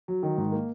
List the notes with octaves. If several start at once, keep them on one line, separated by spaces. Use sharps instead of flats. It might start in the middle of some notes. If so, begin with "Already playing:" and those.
F#3
D#3
G#2
A#3